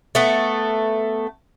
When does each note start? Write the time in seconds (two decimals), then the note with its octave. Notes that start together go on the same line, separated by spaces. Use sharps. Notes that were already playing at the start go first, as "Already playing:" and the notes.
0.15 A3 B3